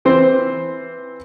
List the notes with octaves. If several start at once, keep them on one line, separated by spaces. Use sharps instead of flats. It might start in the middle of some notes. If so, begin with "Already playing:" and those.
E3 C4 C5